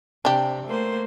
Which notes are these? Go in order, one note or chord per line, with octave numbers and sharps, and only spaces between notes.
C3 D4 G4
A3 A#3 C5